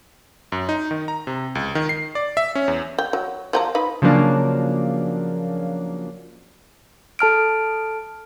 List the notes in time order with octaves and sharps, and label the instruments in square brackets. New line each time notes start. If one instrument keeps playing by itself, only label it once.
[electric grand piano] F#2
D#4
D#3
A#5
C3
C#2
D#3
C7
D5
E5
C#4
E2
[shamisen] G5
F#3
F3 G5 A#5
D#4 B4 B5
[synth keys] C#3 F3 F#3 A#3 D4
[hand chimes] A4 A5 F6 D7